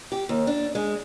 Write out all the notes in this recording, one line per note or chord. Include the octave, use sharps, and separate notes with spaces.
G4
D#2
D4
G#3